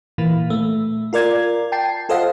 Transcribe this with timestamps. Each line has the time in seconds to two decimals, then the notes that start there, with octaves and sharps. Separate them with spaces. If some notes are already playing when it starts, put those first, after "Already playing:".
0.18 A#2 E3 A#3
0.50 A3
1.13 F4 A#4 D5 G#6
1.72 G5 A5 C7
2.09 F4 A4 C5 D#5 F5 F#5